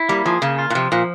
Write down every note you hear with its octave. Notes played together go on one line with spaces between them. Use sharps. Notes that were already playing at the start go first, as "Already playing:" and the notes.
Already playing: E4
G3 A#3
F3 G#4
C#3 A#3
F4
A#2
C3 F3
A#2 F3